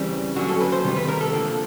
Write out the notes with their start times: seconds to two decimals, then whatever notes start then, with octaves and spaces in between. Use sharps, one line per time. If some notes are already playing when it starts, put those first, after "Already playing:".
Already playing: C#3 E3 G3 C4
0.36 D3 F#3 A#3 C#4 F#4
0.48 A4
0.60 B4
0.72 C5
0.85 C3 D#3 G3 B3
0.97 B4
1.08 A#4
1.21 A4
1.33 D3 F3 A#3